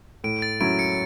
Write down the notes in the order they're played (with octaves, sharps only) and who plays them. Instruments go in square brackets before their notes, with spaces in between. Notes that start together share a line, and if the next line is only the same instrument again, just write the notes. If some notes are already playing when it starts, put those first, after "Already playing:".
[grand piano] A2 [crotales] D7
[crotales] A6
[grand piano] F#3 C#4 E4 [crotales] D7
[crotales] C#7